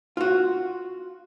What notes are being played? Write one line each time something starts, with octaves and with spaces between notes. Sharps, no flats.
F4 F#4